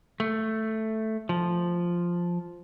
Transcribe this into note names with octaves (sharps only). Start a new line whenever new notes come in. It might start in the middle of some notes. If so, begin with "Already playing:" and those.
A3
F3